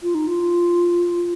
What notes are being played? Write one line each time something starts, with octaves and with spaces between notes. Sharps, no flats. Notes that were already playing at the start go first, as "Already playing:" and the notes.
F4
D#4
F4